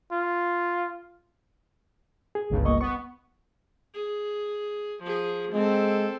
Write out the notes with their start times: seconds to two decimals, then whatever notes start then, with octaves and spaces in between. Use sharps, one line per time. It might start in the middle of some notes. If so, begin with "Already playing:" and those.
0.12 F4
2.35 G#4
2.50 G1 C#2 G2
2.65 A#3 D#5 C#6
2.81 B3 C#6
3.95 G#4
5.03 F3 G#4
5.53 G#3 C4 A4